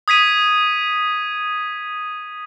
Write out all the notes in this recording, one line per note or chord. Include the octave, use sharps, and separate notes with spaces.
D#6 G#6 B6 D#7